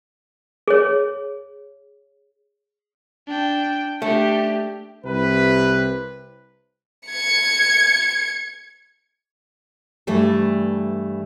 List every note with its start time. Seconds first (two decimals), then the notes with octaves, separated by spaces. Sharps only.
0.68 G#4 C#5
3.27 D4 G5
4.02 A3 D4 G4
5.05 C2 C3 B4
7.08 G#6 C#7
10.07 G2 E3 G3 A3 A4